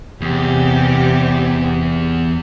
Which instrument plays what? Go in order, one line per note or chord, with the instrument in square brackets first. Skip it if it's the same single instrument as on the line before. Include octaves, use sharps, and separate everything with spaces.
[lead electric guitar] E2 [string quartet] C3 G4